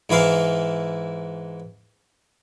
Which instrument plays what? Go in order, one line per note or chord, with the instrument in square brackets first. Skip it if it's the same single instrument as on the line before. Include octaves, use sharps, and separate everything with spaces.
[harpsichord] G#2 E3 E4 F5